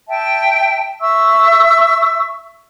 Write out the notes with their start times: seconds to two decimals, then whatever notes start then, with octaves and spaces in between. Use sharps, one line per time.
0.08 E5 G5 A5
1.00 E5 C#6 E6